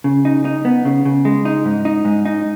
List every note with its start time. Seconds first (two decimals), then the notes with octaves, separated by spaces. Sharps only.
0.04 C#3
0.25 D#4
0.45 D#4
0.65 B3
0.85 C#3
1.05 C#3
1.25 G#3
1.45 D#4
1.65 G#2
1.85 D#4
2.05 G#2
2.25 D#4